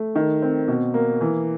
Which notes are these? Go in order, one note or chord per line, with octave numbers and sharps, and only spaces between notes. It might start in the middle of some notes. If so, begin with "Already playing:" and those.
Already playing: A3
D#3
C4
B2
A#3
E3